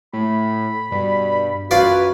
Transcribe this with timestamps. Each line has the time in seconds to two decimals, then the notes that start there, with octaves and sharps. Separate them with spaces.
0.13 A2 B5
0.92 G2 B2 D5
1.71 F#2 F4 F#4 B4 C#5 D5